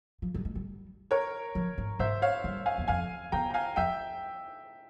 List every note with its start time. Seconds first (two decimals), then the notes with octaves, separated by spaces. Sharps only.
0.22 F3
0.34 G3
0.45 G#3
0.55 G3
1.11 A#4 C#5
1.55 F3
1.78 G#2
1.99 G#2 C5 E5
2.22 C#5 F5
2.44 G2
2.66 F5 G#5
2.78 E2
2.88 F2 F5 G#5
3.32 E2 G5 A#5
3.51 A#5
3.54 F5 G#5
3.76 F2 E5 G5